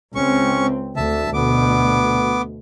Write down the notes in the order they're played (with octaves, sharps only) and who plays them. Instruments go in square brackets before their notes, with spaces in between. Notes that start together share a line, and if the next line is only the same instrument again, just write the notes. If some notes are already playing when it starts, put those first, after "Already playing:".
[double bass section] C#2 C4 [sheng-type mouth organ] C#4 C#6
[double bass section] D2 [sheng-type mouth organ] E5 A5
[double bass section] D2 B2 [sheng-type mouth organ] B3 D6